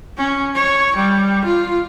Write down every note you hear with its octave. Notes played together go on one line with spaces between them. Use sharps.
C#4
C#5
G3
F4